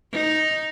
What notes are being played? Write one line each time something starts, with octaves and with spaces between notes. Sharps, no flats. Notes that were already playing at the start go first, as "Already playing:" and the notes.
D#4